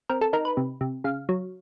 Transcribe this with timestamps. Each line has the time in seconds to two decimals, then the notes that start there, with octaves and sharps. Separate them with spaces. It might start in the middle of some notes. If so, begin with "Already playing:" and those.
0.09 C4 A#4
0.21 A4
0.33 D#4 A#4
0.45 B4
0.57 C3
0.81 C3
1.04 C#3 F5
1.29 F#3